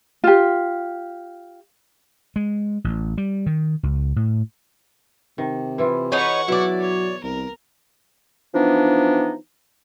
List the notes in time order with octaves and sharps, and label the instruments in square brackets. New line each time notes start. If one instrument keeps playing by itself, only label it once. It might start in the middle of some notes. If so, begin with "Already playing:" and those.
[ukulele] F4 G4
[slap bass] G#3
A1
G3
D#3
C#2
A2
[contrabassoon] C3 [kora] D#3
[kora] E3 E4 F4
[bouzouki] D#4 B4 C#5 [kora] G#4 [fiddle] F#5 C#6
[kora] B2 [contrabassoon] F#3 [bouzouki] E4 D5
[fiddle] C#5
[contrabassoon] C2 [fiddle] A#4
[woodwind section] E3 F3 B3 D4 D#4